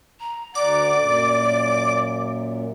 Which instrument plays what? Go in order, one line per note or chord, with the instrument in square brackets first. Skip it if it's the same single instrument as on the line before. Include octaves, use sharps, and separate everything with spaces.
[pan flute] A#5
[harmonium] D2 F#5 A#5 [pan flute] D5 [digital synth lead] D6
[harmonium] F#2 A#2